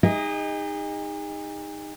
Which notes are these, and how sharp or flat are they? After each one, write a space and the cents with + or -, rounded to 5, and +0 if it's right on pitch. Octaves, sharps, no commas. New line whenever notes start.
D#4 +0 G#4 -40 D#5 +5